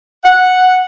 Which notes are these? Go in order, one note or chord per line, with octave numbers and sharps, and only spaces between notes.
F#5